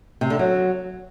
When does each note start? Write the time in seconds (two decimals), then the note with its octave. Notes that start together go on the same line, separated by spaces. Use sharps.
0.21 C3
0.30 D3
0.39 F#3